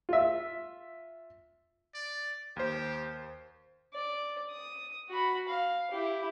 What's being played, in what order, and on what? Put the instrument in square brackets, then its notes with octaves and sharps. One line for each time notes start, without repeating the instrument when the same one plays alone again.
[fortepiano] F4 E5
[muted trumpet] D5
[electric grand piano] D#2 C5 [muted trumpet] G4
[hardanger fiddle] D5
D#6
F#4 B5
F5
E4 G4